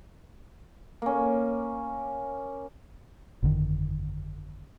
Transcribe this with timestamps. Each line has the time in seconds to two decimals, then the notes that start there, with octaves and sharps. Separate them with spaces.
1.02 A#3 C#4
3.42 G1 F2 D3 D#3